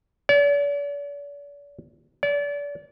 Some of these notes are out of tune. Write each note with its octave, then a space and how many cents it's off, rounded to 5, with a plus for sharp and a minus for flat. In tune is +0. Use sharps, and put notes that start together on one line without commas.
D5 -45
D5 -35